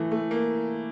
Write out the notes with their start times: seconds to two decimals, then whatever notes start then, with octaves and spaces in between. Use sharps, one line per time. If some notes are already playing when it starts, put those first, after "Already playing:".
Already playing: E3 A3
0.12 A3
0.31 A#3